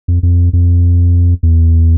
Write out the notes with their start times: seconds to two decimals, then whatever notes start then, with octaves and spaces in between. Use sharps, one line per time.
0.08 F2
0.23 F2
0.53 F2
1.43 E2